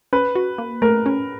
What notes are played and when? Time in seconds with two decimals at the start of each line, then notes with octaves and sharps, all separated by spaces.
0.13 C#4 B4
0.35 F#4
0.58 A#3
0.82 A3 A#4
1.06 C#4